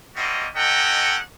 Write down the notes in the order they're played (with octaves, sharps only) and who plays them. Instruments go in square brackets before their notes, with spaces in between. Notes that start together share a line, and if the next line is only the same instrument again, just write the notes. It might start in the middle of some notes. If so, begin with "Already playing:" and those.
[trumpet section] G3 A#3 C4 F#4 D#5
C#4 D#4 A4 D#5 F#5 G5